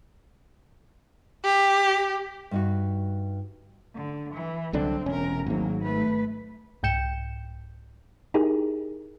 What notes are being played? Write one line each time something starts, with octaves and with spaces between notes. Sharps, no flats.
G4
G2 D#4 F#4
D3
E3
C2 D3 F#3 C4 D4
E1 C3 C#4 A#4
G#1 G#2 F#3 A#3
A3 B4
C2 G#2 G5 G6 C#7 E7
D#4 E4 G4 G#4 A#4